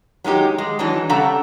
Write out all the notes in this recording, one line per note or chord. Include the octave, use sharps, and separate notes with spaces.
F#3 G#3 D#4 G4
G#3
E3 F#3 D4 D#4
C#3 G3 D4 A4 F#5 A#5